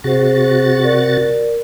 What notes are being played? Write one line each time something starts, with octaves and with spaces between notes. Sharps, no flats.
C3 F#4 G#4 C5 A6
A#4 D5